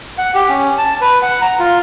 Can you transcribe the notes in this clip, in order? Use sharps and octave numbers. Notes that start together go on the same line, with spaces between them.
F#5
G4
C#4
A5
B4
F#5
A#5
F4